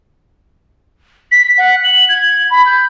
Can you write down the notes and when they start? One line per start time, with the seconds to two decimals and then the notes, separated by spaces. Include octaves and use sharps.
1.31 B6
1.58 F#5
1.84 F#7
2.09 G#6
2.50 B5
2.66 G6